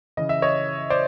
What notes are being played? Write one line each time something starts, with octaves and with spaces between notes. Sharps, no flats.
C#3 E3 D#5
E5
C#5 D#5
C5 D5